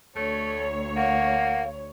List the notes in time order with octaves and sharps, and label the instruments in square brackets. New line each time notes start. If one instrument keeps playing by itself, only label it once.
[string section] D2 C#5 [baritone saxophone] A3
[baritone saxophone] A#3 [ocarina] F5 [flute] F#5